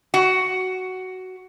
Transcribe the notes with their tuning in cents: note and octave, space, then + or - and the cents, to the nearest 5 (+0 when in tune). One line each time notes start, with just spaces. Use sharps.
F#4 +10